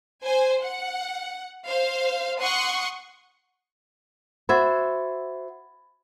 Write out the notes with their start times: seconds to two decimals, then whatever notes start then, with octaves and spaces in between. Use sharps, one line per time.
0.23 C5 G#5
0.61 F#5
1.66 C5 F5
2.40 F#5 C6 C#6 D#6 F#6
4.49 F#4 C5 E5 B5 G#6 A6